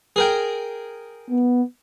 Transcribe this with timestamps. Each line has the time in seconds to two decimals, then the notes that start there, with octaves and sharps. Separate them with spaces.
0.16 G#4 A#4 G5
1.30 B3